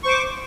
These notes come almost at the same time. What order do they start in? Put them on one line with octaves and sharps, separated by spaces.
C#6 C5 D6